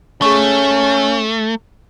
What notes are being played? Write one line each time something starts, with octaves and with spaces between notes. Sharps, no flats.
A3 C#4 G#4 C#6